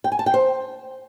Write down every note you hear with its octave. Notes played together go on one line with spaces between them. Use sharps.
G5
G#5
A5
G5
C5